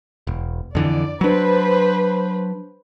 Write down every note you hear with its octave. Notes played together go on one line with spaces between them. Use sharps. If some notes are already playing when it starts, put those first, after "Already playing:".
E1
F2 D3 E3 D5
F#3 D4 B4 C5 B5